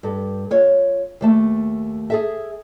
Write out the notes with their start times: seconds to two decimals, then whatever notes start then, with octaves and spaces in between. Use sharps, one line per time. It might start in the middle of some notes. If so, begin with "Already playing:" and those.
0.03 G2 A4
0.51 F4 C#5
1.21 D#2 A3 A5
2.10 G#4 A4 E5